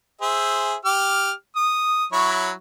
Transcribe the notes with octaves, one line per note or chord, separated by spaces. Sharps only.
G#4 C5 E5
G4 D6 F6
D#6
F#3 E4 C#5